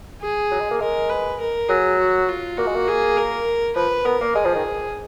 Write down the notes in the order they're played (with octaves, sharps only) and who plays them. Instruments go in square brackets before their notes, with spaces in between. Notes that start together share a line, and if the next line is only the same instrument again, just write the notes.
[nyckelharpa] G#4
[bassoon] F#3
G#3
A#3
[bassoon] G#3 [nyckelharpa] A#4
[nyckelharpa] B4
A#4
[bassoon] F#3 [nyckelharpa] G#4
[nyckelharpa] F#4
F4
[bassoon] A#3 [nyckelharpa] F#4
[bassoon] G#3
A#3
[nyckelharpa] G#4
A#4
[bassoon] F3 [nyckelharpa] B4
[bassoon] B3 [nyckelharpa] A#4
[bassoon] A#3
[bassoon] G#3 [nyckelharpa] G#4
[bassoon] F3
D#3